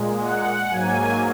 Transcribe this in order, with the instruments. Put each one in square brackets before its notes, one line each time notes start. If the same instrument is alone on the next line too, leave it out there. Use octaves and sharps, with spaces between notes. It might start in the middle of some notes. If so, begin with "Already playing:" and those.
Already playing: [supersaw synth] A#2 G#3
F#5
G#2 F#3 A#3 G#5